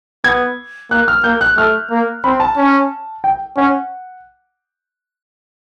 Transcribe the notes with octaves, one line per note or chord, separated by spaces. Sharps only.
B3 G#6
A#3 F#6
F6
A#3 G6
F#6
A3 F6
A#3
C4 B5
A5
C#4
G5
C#4 F#5